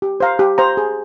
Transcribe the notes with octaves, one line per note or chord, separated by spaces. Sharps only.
G4
C5 F5 A#5
G4
C5 F5 A#5
G#4